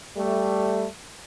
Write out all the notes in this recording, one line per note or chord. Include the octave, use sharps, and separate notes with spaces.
G3 A3